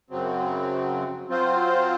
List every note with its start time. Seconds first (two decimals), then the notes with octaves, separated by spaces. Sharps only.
0.10 F#2 C#3 F#3 C4
1.28 F#3 C4 F4 C5